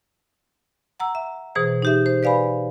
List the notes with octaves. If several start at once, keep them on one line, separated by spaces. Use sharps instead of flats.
F#5 A#5 E6
E5
B2 E3 G#4 C5
D#4 G4 E5
C5
B4 D5 F5 G#5 B5